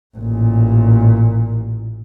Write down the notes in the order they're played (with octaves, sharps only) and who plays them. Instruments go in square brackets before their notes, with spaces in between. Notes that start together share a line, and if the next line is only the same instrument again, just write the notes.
[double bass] A1 A#2